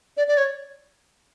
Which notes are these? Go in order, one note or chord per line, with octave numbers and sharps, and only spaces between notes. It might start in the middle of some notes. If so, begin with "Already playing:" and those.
D5
D5
C#5